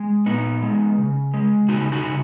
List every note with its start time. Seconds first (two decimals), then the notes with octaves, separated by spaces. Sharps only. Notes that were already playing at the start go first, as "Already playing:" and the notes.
Already playing: G#3
0.26 A#2 B3 D#4
0.62 G#3
0.98 C#3
1.34 G#3
1.68 C#3 D#4 F#4
1.92 D#4 F#4
2.04 C#3